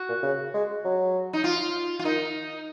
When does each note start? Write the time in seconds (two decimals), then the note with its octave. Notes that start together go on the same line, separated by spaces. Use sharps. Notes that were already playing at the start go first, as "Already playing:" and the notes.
Already playing: F#4
0.09 A#2
0.23 C#3
0.54 G#3
0.85 F#3
1.33 D#4
1.44 F4
1.99 F4
2.04 D#3 D#4